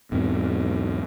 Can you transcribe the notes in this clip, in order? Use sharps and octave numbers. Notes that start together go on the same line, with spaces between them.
B1 E2 G#2 C4